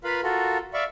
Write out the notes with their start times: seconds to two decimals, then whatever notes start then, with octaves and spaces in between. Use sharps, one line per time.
0.04 F4 A#4 B4 F5 B5
0.23 F4 F#4 A4 A#4
0.74 D5 E5 F5 B5 C#6